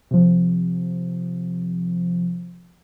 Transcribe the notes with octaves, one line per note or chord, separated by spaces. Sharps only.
C3 F3